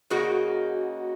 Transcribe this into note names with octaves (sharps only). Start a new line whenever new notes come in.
C#3 A#3 D#4 F#4